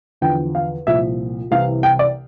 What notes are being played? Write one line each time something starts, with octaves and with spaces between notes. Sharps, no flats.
E2 D3 F3 G5
F5
C2 A#2 F3 E5
C2 C3 E3 F5
G5
D5